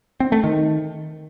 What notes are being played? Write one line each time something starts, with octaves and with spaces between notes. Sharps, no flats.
C4
A3
D#3